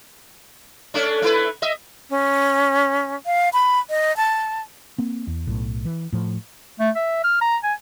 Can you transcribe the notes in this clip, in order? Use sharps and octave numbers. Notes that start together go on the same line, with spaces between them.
A3 C#4 D4
A3 E4 B4
D#5 E5
C#4
F5
B5
D#5
A5
A#3 C4
E2
B1 A2
E3
A2 F3
A3
E5
F6
A#5
G#5